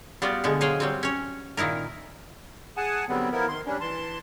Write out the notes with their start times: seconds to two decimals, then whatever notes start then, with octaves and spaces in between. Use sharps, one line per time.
0.22 G3 B3 F4 F#4 D5
0.44 B2 D3 G#3
0.61 F#3 G#4 C5 F5 G5
0.80 F#3 G3 C4
1.03 C#4 C#5
1.57 A#2 D#3 D#4 E4 A#4
2.77 G#4 F#5 G#5 A5
3.09 D3 F#3 G3 B3 C4
3.32 F3 B3 E4 A#4
3.48 D#3 C6
3.66 G3 C#4 D4
3.81 E3 A5 C6